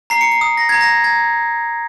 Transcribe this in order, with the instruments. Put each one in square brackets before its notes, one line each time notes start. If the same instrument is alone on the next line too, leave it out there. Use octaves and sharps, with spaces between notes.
[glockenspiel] A#5 C7
C#7
C7
D#6
A#6
A#5 G#6
A#6
A#5 G#6